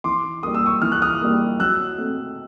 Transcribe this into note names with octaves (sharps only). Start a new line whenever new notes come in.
E3 C6 D6
G3 A#3 D#6
E6
C#6 D#6
E3 F6
F#6
D#6 F6
G3 A#3
F#3 E6 F#6
A3 C4